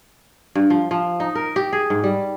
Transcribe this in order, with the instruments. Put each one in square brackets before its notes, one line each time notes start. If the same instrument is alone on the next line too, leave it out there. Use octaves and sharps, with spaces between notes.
[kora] G2
F3
F3
D#4
A#4
G4
G#4
G#2
G3